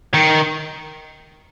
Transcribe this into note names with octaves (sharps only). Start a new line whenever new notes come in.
D#3